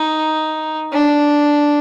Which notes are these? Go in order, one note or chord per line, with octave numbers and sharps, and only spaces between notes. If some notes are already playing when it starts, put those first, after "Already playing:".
Already playing: D#4
D4